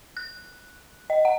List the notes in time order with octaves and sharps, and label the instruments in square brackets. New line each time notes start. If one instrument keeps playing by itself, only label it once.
[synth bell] F#6
D#5
F#5